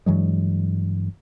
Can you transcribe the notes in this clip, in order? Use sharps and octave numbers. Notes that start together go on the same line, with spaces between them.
G2 E3 F#3 G#3